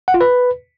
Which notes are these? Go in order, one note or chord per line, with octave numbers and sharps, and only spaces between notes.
F#5
F4
B4